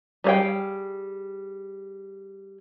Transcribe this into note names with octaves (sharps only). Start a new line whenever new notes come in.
G3 G#4 C#5 F5 G5